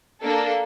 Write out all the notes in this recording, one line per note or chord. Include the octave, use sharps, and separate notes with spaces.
A#3 D4 A4